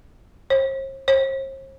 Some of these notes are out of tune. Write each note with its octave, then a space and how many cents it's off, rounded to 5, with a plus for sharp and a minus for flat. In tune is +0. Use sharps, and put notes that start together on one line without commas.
C5 +45
C5 +45